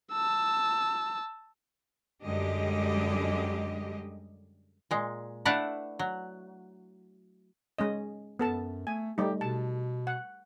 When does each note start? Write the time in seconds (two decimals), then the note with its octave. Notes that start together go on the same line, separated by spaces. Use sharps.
0.12 A5 E6
2.24 F#2 D3 G3 G#3 G4 D#5
4.91 A#2 G#3
5.45 A3 D4 E4 B4 F5 F#5
5.99 F#3
7.78 G#3 C#4 D#5
8.39 F#2 B3 A4 A5
8.87 A3 G#5
9.18 G3 A3 D#4 G4
9.41 B2 A5
10.07 F#5